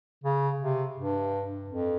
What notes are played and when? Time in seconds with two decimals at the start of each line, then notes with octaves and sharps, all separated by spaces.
0.24 C#3
0.60 C3
0.97 G2
1.70 F2